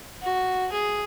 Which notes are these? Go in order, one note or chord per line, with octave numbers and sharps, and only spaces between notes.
F#4
G#4